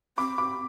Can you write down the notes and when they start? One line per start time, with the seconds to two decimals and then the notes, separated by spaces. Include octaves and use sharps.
0.18 C4 B5 D6
0.38 B5 D6